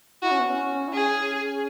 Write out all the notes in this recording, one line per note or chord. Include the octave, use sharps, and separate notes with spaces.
E4 F#4
C#4
B3
C#4
E4
C#4 G#4